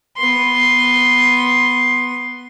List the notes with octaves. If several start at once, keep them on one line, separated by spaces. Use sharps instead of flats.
B3 C6